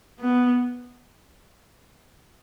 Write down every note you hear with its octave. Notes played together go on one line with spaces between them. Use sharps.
B3